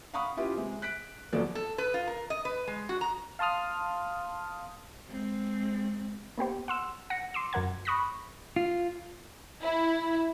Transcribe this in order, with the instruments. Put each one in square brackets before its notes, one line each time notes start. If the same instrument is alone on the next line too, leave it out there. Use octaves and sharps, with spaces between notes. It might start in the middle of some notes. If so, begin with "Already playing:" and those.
[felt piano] F5 F#5 A#5 B5 C#6 D#6
C#4 E4 F4 G4 B4
C3 G#3
F#6 B6 D7
F#1 E2 F3 F#3 A4 D5
[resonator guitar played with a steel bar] A4
B4
F4
A#4
D#5
B4
G#3
F#4
A#5
[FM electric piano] F5 A5 C6 D#6 F6
[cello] G#3 C4
[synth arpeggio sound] A#3 B3 G4 C5
F#5 C6 E6
F#5 A#6 C#7
C6 D6 E6
F#2 F#3 A#4 F#5 G#6
B5 C#6 D#6 F#6 A#6 B6
[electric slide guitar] F4
[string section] E4